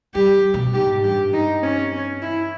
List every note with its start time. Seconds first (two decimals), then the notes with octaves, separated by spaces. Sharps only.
0.14 G3 G4
0.54 B2
0.74 G#2 G4
1.04 G2 G4
1.33 D#4
1.63 C#4
1.92 C#4
2.22 E4